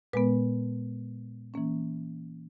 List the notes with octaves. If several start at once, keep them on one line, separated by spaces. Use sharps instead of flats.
A#2 G#3 B3 B4
E3 A#3 C#4